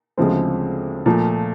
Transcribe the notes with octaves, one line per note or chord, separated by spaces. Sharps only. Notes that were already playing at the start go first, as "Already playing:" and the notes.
D2 C#3 F3 G#3 C4
A#2 F3 A3